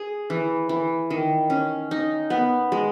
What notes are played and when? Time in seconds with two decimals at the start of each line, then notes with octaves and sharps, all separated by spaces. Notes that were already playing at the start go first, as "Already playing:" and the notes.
Already playing: G#4
0.30 E3
0.69 E3
1.10 D#3
1.50 C#4
1.91 D#4
2.30 B3
2.72 G#3